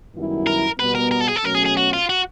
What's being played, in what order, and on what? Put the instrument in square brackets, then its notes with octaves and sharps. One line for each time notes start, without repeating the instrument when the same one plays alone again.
[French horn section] F#2 D#3 G3 B3 E4
[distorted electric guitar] A#4
[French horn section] B2 G3 B3 [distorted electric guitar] B4
[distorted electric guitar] A#4
A#4
A4
G#4
A4
[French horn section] B2 F#3 A3 C#4 [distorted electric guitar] A#4
[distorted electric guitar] G#4
G#4
F#4
F4
F#4